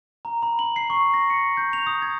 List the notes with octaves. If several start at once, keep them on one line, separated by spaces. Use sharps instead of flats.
A#5
B5
F#7
C7
C#6
A#6
C#7
G6
F7
D#6
G#6